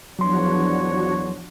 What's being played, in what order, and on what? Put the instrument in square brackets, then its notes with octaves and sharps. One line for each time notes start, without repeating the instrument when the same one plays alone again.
[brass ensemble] E2 C#5 [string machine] F3 D4 F#4 [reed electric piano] F#3 C6